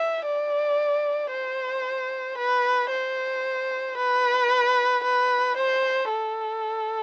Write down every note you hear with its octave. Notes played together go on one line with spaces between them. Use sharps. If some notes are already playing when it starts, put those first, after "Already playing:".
Already playing: E5
D5
C5
B4
C5
B4
B4
C5
A4